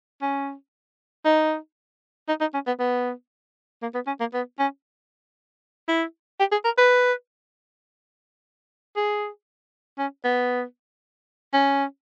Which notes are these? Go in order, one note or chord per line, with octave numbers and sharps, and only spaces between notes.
C#4
D#4
D#4
D#4
C#4
B3
B3
A#3
B3
C#4
A#3
B3
C#4
E4
G4
G#4
A#4
B4
G#4
C#4
B3
C#4